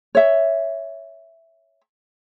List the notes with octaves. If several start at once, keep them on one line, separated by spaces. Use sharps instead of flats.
C#5 E5